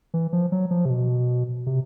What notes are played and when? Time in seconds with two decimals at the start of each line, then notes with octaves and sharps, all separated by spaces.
0.14 E3
0.33 F3
0.52 F#3
0.71 F3
0.85 C3
0.90 B2
1.66 C3